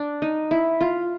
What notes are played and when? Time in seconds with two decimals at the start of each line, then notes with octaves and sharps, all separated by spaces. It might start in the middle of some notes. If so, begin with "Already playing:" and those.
Already playing: D4
0.22 D#4
0.51 E4
0.81 F4